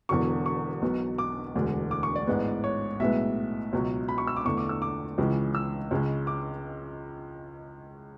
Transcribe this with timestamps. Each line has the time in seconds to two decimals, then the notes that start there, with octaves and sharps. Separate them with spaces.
0.09 E1 E2 D3 F#3 C#6
0.46 C#6
0.82 B1 B2 F#3 B3
1.18 D6
1.55 E1 D2 D3 G#3
1.91 D6
2.03 C#6
2.16 D5
2.27 A1 G#2 G#3 B3
2.64 C#5
3.00 B1 A2 G#3 B3 E5
3.73 C#2 B2 F#3
4.09 B5
4.18 C#6
4.27 E6
4.37 D6
4.45 E2 D3 A3 C#6
4.57 D6
4.69 E6
4.82 D6
5.18 C#2 C#3 E3 G#3
5.55 E6
5.91 C#2 C#3 G#3
6.27 D6